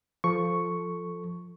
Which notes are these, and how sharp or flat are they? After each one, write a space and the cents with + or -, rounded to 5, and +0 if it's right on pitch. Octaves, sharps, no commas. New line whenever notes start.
F3 +0 A4 +0 C#6 +0